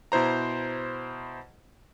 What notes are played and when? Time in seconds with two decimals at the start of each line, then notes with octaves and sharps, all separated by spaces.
0.12 B2 E4 C5 A#5